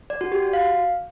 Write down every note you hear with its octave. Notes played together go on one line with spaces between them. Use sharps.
D5
F#4
G4
F#4
F5